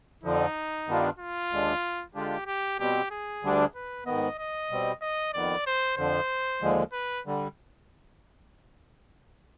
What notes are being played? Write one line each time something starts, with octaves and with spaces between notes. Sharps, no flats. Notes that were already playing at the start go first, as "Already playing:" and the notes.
F2 D3 F3 D#4
G2 D#3 B3 D4 F4
F4
D#2 D3 G#3 D4
D3 G#3 D4 F4 G4
G4
B2 G3 C4 G4
G#4
D2 D3 G3 D4
B4
G#2 D#3 B3 D#5
D#5
B2 G3 C4
D#5
F2 D#3 B3 D5
C5
F2 D3 F3 C5
D#2 D3 F3 G#3
B4
D3 G3